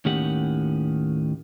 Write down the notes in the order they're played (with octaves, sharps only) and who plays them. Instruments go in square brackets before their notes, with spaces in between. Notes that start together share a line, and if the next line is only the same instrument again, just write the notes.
[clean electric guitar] D#2 A2 D#3 C#4 G4 F#5